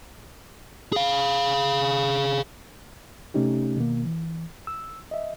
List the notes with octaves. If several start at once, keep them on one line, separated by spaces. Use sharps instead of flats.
G#4 F5
C3 A3 C#4 D#4 G4
B2 D#3 A#3
E3
E6
D#5 E5